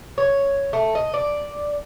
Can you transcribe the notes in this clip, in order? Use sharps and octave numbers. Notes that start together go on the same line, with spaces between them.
C#5
A3
D#5
D5